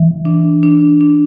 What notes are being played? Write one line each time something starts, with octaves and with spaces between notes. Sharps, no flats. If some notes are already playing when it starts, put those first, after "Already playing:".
Already playing: E3
D4
D4
D4